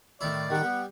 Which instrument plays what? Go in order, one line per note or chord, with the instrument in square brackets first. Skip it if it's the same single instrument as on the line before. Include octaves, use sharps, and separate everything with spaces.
[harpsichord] A2 D#3 E4 [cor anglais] D5
[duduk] D#3 [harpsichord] G3 G4 [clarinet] F#5
[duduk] B3